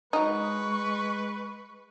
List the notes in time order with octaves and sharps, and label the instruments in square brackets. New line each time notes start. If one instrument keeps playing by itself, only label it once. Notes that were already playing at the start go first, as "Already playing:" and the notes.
[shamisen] F#3 D#4 [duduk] G#3 [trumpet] B4 [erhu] C#6